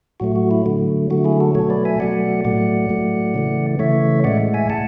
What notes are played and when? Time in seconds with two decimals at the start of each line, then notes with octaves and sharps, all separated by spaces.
0.20 A2 F#3 A3 F#4
0.36 F#4
0.51 E4
0.66 D3 F#3 A3
1.10 D3 F#3 A3 F#4
1.24 E4 G#4
1.40 F#4 A4
1.55 B2 F#3 A3 A4 C#5
1.70 B4 D5
1.85 E5 G#5
2.00 B2 F#3 A3 D5 F#5
2.45 A2 F#3 A3 D5 F#5
2.90 A2 F#3 A3
3.34 C#3 E3 A3
3.79 C#3 E3 A3 C#5 E5
4.24 A2 G#3 D5 F#5
4.54 E5 G#5
4.69 A2 F#5 A5